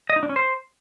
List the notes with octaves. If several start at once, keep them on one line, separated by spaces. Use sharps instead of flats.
D#5
D#4
D4
C#4
C5